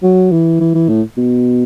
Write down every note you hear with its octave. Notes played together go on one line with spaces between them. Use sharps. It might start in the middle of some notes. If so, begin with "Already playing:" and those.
F#3
E3
E3
E3
A2
B2